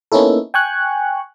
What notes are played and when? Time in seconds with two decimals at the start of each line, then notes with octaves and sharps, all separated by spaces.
0.12 A#3 B3 C#4 D#4 E4 A4
0.54 G5 G#5 C#6 F#6